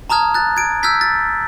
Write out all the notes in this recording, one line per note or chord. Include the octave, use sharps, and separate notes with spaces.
A5 A#5 D#6 F6 G#6
F#6 A6
G#6 D7
E6 F6 G6 G#6 B6
A6